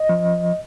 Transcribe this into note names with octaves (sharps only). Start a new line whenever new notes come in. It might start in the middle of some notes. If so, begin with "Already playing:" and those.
Already playing: D#5
F3